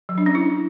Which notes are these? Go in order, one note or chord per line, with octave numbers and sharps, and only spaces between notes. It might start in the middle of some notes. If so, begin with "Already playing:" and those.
F#3
D4
C#4
E4